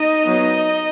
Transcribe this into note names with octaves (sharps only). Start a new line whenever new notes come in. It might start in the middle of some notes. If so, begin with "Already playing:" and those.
Already playing: D#4 D#5
F#3 B3